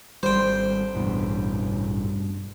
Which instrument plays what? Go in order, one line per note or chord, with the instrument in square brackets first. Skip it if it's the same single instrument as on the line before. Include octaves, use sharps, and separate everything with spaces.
[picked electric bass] G#1 G3 [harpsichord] C5 G5
[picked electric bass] A1 E2 B2 [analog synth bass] G2